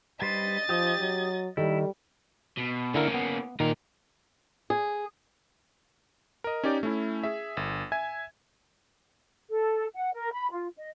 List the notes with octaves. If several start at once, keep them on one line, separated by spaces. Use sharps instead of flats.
G3 B4 C5 D#5 A6
F3 G4 D#6
F#3
D#3 G3 E4 A4 D#5
B2
D3 A#3 C#4 E4 A#4
B3
A#2 D#3 A#4
G#4
A#4 D#5
C#4 D#4 G4 D5
A3 C#4 E4
G#4 E5
G1
E5 G#5 G#6
A4
F#5
A#4
B5
F4
D#5